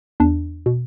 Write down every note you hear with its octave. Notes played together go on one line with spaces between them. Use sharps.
E2 D4
B2